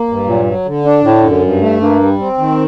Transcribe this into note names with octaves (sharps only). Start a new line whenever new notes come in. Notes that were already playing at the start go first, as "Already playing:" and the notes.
Already playing: A#3
G2
A#2 F#3
F#3
D3
D4
A2 D3
F#2
G2
A3
G2 A#3
G3
C4
D#3